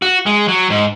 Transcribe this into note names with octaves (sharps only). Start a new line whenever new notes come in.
F#4
G#3
F#3
G#2